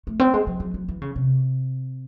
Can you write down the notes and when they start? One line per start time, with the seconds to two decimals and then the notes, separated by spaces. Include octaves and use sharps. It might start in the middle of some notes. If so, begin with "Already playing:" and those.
0.07 A3
0.20 C4
0.34 G#3
0.47 F#3
0.60 F#3
0.74 F#3
0.89 E3
1.02 C#3
1.16 C3